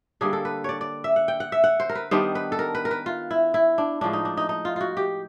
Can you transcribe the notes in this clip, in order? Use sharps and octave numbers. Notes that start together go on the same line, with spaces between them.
D3 G3 A#3 D4 G#4
A4
B4
C#5 D5
D5
E5
F#5
G5
F#5
E5
F#5
C5
A#4
B4
D#3 G3 B3 D4 C5
B4
A4
A#4
B4
A#4
B4
F4
E4
E4
D4
A2 F3 G#3 D4
D#4
D4
D#4
D#4
F4
F4 F#4
G4